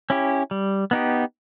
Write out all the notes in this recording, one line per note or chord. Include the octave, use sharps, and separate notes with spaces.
C#4 E4 G4
G3
B3 D#4 G4